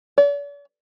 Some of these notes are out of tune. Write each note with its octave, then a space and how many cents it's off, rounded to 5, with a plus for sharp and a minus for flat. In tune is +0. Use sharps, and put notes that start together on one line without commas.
D5 -45